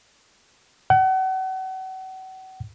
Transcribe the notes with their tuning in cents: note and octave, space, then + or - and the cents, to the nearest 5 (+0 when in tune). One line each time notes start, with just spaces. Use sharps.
F#5 +35